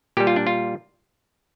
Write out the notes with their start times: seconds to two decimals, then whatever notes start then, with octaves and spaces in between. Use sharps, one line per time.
0.17 A#2 G3 G4
0.27 F4
0.36 D4
0.47 F4